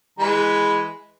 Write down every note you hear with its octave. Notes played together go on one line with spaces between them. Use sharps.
E3 G#3 B5